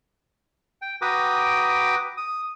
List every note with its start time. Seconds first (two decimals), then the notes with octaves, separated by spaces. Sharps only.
0.82 G5
1.02 F#4 B4 G5 A#5 D6 D#6
2.17 D#6